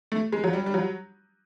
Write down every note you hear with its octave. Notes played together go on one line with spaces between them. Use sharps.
A3
G#3
F#3
G3
G3
F#3